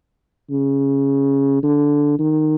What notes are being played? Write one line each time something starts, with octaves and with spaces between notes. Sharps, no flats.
C#3
D3
D#3